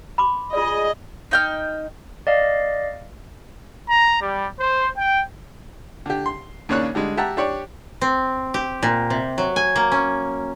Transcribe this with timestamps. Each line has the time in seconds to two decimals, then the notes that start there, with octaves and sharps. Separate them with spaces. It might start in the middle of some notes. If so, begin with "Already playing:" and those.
0.18 B5 C6 D6
0.53 F4 G#4 D5 D#5
1.31 D#4 G5 F6
2.27 D5 D#5 F5
3.89 A#5
4.21 G3
4.60 C5
4.97 G5
6.06 D3 G4
6.26 C6
6.69 D#2 C#3 A#3 D4 C#5 F#6
6.95 D3 G3 G#3
7.17 G4 E5 F#5 A5 A#5
7.37 D4 G4 C#5 D5
8.01 C4
8.54 G4
8.83 A#2
9.10 C3
9.38 F#3
9.56 G#5
9.76 A#3
9.92 C#4